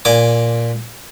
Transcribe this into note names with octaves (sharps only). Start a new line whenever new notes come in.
A#2 G#5 D6